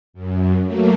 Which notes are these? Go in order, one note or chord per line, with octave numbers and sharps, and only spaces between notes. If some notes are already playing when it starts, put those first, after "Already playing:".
F#2
F#3 A3 A#3